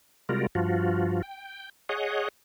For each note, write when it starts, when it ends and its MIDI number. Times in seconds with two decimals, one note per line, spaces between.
0.29 0.47 48
0.29 0.47 55
0.29 0.47 56
0.29 0.47 65
0.29 0.47 66
0.29 0.47 70
0.55 1.22 43
0.55 1.22 53
0.55 1.22 65
0.55 1.22 66
1.23 1.69 79
1.89 2.28 68
1.89 2.28 73
1.89 2.28 75
1.89 2.28 78